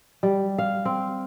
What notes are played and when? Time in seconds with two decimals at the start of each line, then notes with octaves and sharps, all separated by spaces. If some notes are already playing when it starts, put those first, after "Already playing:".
0.23 G3
0.58 F5
0.85 C4